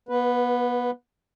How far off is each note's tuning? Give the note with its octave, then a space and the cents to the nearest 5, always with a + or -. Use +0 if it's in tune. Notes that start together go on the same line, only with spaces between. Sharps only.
B3 -30 B4 +0